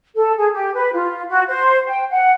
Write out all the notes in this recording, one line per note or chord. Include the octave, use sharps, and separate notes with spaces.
A4
G#4
G4
B4
F4
F#4
C5
G5
F#5